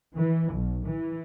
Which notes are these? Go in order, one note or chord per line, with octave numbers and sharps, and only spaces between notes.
E3
B1
E3